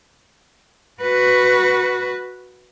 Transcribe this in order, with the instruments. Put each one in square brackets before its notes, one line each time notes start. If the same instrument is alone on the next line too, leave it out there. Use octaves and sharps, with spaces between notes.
[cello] F#4 B4